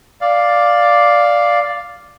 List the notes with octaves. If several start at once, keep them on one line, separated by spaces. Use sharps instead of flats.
D5 F5